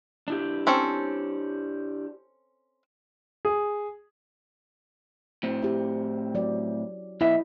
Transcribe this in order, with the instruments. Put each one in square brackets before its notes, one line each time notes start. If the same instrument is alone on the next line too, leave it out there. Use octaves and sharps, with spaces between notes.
[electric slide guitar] D4 E4 G4
[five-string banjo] C4 C#4 A4
[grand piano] G#4
[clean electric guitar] A2 C4
[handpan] E4 G4
F#3 D5
[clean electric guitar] B1 B3 E5 [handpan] E4 D#5